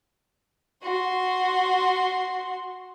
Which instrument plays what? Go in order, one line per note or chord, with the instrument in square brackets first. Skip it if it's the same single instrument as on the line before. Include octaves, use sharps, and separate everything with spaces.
[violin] F#4 C6